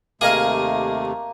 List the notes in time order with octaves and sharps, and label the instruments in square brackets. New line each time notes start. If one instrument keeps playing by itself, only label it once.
[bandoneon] D#2 C3 A3 [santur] A#3 [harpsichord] G#4 D#5 F5